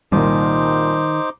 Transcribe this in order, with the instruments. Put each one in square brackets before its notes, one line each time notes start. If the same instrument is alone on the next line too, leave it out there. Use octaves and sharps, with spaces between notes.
[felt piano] C2 A#2 [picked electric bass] D#3 [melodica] D#4 C5 D6